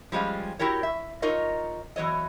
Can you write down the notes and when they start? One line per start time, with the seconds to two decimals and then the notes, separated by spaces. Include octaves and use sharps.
0.12 F3 G3 G#3 C#4 F4
0.59 E4 F#4 G4 A#4 C#5
0.83 E5
1.22 D#4 F4 A#4 C#5 D#5
1.96 E2 F#3 C#5 D#5